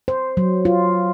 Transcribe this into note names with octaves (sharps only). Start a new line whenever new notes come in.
C5
F#3
F4